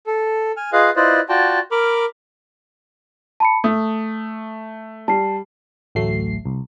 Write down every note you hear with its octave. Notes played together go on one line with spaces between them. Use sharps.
A4
G#5 F6
F4 G#4 B4 D#5 F5
E4 F4 B4 C5 D5 D#5
F4 F#4 D5 G5 A5
A#4 B5 D6 F6
A5 B5 C#7
A3 D#6
G3 A5 C7
A1 D2 F#3 A3 C7
C2